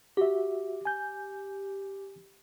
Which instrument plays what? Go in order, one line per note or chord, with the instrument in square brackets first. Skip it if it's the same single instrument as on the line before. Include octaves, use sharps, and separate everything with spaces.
[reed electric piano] F#4 E5 [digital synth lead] G4
[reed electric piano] G#5 G6